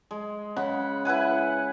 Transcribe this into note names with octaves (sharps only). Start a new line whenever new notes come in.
G#3
C#3 F#5 B5
E4 B4 F#5 G#5